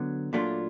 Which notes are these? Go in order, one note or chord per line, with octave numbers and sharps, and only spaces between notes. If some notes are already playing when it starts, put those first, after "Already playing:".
Already playing: D3 F#3 B3
A#2 F#3 A3 D4 F4